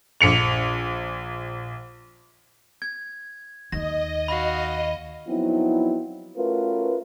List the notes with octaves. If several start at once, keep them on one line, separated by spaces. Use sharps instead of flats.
A#1 C#7 F7
G#6
D#2 D#5 A#6
F#4 F5 B5
F3 F#3 B3 C4 D#4 E4
A3 C#4 F4 F#4 A#4 B4